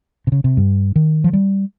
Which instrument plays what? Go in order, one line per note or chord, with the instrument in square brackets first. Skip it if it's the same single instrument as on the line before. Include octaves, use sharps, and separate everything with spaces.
[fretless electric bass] C3
C#3
C3
G2
D#3
F3
G3